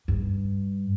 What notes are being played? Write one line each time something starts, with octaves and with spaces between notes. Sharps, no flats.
G2